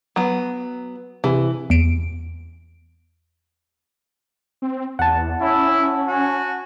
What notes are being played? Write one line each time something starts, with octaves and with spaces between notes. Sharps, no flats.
F#3 B3
C3 E3
E2 D7
C4
E2 F#5 A5
C#4 E4
F#4 G#5